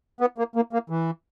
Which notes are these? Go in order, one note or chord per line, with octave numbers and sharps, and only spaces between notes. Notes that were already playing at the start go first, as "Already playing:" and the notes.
B3
A#3
A#3
A#3
E3